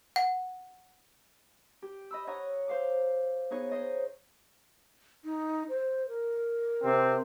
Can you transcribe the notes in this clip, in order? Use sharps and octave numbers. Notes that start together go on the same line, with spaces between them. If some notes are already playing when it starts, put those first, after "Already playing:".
F#5
G4
D#5 B5 E6
C#5 D#5 F#5 A#5 C#6
C5 F5 D6
B3 D#4 G#4 C#5
C5 C#5 D#5
D#4
C5
A#4
C3 C4